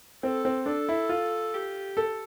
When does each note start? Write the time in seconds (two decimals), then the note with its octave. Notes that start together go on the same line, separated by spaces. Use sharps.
0.23 C4 A4
0.45 C4
0.66 D4 A4
0.89 E4
1.09 F4
1.53 G4
1.97 A4